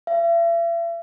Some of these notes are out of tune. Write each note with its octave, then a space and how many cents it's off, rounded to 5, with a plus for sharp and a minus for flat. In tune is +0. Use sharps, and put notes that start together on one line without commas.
E5 +40